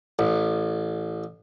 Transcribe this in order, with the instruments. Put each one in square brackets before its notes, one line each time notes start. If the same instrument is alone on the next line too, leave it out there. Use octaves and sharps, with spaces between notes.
[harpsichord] A1